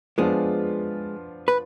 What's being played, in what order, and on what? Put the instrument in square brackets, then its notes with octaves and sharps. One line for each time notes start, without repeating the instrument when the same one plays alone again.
[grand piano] F3 B3 D4 F4 [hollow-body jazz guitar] G#3 G#4
[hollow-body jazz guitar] B4